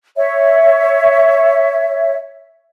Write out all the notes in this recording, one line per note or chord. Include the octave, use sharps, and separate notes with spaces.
C#5 E5